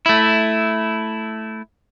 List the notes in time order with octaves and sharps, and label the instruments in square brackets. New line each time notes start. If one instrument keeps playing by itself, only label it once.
[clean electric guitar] A3 E4